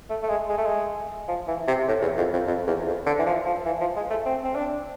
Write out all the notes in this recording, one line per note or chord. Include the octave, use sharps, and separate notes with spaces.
A3
A3
G#3
G#3
A3
G#3
F3
E3
C3
A2
E2
F2
F2
F2
E2
F2
D3
E3
F3
F3
E3
F3
G#3
A3
C4
C4
D4